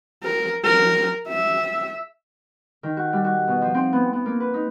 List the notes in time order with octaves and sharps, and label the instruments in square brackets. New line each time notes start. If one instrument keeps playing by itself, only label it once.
[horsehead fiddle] A#4
A#4
E5
[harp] D#3
F#4
G3
F#4
B2
F3
C4
B3
B3
A#3
B4
D#4